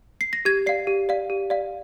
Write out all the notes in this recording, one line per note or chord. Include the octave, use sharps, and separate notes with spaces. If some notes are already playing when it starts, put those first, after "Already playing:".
C7
A#6
G4 G#6
D5 F5 C7
G4
D5 F5
G4
D5 F5